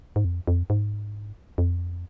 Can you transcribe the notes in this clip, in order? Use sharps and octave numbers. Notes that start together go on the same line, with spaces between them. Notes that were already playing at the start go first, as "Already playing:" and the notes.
G#2
F2
F2
G#2
F2